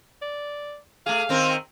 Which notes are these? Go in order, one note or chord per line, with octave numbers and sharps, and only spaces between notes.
D5
A3 G#4 F5
D#3 C4 A#4